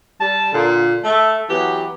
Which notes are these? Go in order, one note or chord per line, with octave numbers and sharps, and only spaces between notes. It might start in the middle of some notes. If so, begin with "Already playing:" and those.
G3 A5
A#2 D3
A3 A4
E3 F#3 B3 G4